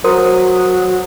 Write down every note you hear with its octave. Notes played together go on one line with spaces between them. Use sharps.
F#3 A#4 C5 D#6